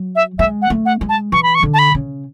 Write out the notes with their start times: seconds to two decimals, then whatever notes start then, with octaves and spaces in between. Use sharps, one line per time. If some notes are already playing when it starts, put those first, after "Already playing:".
Already playing: F#3
0.16 E5
0.39 G#3 E5
0.62 F#5
0.70 A3
0.86 F#5
1.01 G#3
1.09 A5
1.32 E3 C#6
1.43 B5
1.55 C#6
1.63 D3
1.74 A5
1.79 B5
1.95 C#3